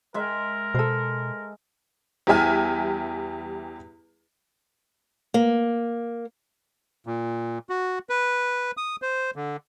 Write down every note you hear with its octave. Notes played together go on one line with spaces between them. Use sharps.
G#3 A#4 E5
B2 A4 C5
E2 G3 G4 E5 G#5 F6
A#3
A#2
F#4
B4
D#6
C5
D3